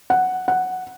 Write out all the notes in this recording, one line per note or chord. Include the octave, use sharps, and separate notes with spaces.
F#5
F#5